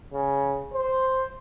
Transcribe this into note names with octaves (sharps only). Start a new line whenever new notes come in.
C#3
C5